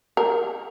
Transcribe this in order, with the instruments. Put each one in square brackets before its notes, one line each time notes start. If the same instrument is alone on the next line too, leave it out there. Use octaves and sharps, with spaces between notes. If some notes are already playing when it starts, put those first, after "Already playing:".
[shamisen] A#4